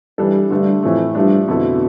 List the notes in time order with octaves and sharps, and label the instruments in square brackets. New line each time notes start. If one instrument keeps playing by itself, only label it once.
[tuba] G2 [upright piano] E3 G3 D4 A4
[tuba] G2 [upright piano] D3 A3 D4
[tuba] F2 [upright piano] A2 E3 A3
[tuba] G2 [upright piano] F3 A3 D4
[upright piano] F2 D3 A3 E4 A4 [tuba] B2